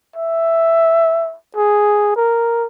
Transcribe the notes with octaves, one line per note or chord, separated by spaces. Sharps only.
E5
G#4
A#4